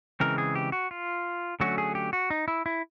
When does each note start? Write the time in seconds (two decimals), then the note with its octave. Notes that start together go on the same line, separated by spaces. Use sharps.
0.20 C#3 E3 G#3 C4 A#4
0.38 G#4
0.55 G4
0.72 F#4
0.91 F4
1.60 D3 F#3 A3 C#4 F#4
1.78 G#4
1.95 G4
2.13 F#4
2.30 D#4
2.48 E4
2.66 E4